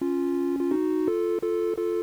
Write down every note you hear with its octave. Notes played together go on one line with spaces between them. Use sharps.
C#4 F4
F4
D#4 F#4
F4 A4
F4 A4
F4 A4